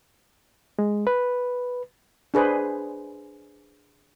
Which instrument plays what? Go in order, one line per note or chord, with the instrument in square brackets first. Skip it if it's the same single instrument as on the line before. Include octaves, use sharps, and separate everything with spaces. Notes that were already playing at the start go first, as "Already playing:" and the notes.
[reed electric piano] G#3
B4
[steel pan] D4 G#4 B4 C5